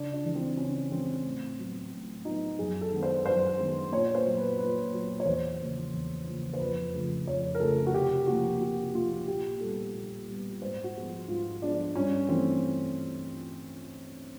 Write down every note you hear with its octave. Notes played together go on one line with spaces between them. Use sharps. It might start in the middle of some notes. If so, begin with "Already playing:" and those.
Already playing: C#3 D4
D4
E3 G#3
C4
C#3 C#4
E3 G#3 C4
A2
F#3 B3
A2
F#3 B3 D#4
F#2 G#4
A4
D#3 G#3 B3
C5
F#2 C5
D#3 G#3 B3
A#2 C#5
C5
F#3 B3
B4
A#2 B4
F#3 B3
C#5
E2 C5
C#3 F3 A#3
E2
C#3 F3 A#3
C5
F2 B4
C#3 F3 A3
F2 C#5
A#4
C#3 F3 A3 A4
F#4
C3 G4
F3 A#3 F#4
C3 F#4
F3 A#3 F4
A#2 G4
G3 B3 A4
A#2
G3 B3
G#2 C5
F#4
F3 G#3 B3
G#2 F4
F3 G#3 B3 D4
G2 C#4
E3 A3 C4